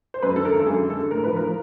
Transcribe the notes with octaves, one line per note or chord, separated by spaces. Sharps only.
C5
F#2 B4
D3 A4
A#4
G#1
A4
F#2 G#4
D3
A4
D3
A2 A#4
F3 B4
F3 A#4